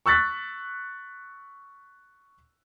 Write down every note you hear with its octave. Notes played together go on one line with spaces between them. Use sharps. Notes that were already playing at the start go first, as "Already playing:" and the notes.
C#6 E6 F#6 A6 B6